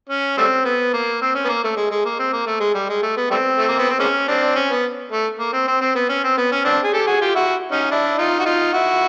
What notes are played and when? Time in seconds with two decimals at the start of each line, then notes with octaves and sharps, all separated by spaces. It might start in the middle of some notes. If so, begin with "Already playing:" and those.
0.09 C#4
0.38 G3 A3 C4
0.65 B3
0.93 A#3
1.22 C4
1.35 C#4
1.45 B3
1.49 A#3
1.64 A3
1.76 G#3
1.90 G#3
2.05 A#3
2.19 C4
2.33 A#3
2.46 A3
2.60 G#3
2.74 G3
2.89 G#3
3.02 A3
3.17 B3
3.30 G3 A3 C4
3.58 A3
3.68 A#3
3.79 B3
3.90 C4
3.99 G#3 A#3 C#4
4.28 C4 D4
4.56 C#4
4.70 B3
5.12 A3
5.39 A#3
5.53 C4
5.68 C4
5.81 C4
5.95 B3
6.09 C#4
6.24 C4
6.37 B3
6.52 C#4
6.64 C4 D4
6.84 G#4
6.93 G4 A4
7.06 F#4 G#4
7.21 F4 G4
7.34 E4 F#4
7.72 C#4 D#4
7.91 D4 E4
8.18 D#4 F4
8.39 F#4
8.46 D#4 F4
8.73 E4 F#4